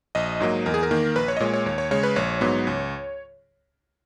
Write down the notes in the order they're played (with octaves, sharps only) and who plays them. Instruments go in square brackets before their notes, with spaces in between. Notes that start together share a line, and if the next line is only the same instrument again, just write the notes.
[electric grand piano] A#1 D#5
G#2 F#3 A#3
E2 A#4
G#4
A#4
D#3 A#3
A#1 B4
C#5
D#5
A#2 G#3 C#5
C#5
D#2 C#5
C#5
C#3 G#3 C#5
B4
A#1 C#5
G#2 F#3 B3
C#2